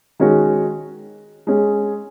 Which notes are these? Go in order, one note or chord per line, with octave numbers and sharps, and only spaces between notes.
D#3 G#3 C#4 F#4
G#3 C#4 G#4